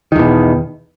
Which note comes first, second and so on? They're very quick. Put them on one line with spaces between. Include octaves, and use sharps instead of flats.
D#3 E2 B2